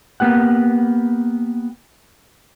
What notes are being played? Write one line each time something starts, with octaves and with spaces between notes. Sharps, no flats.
A#3 B3 G4 F#5